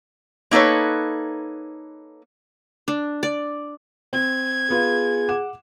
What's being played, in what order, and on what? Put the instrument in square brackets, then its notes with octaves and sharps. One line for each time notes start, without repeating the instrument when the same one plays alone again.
[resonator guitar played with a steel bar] A#3 D#4 A4 B4 C#5
[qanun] D4
D5
[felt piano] C4 [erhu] G#6
[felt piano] B3 F4 [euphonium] G#4
[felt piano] F#5 D6 E7